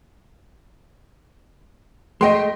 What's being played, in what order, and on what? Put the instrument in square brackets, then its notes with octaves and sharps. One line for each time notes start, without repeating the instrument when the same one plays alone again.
[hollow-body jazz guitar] G#3 A3 [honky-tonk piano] D#5 G5 C6